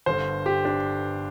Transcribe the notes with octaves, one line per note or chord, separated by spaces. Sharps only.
G1 G2 D3 C5
G4
D4